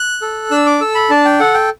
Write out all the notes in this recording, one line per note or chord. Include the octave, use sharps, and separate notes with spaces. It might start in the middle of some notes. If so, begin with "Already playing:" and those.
Already playing: F#6
A4
D4 E6
D6
A4 E6
B5
D4 A5
G5
A4 F#5
G5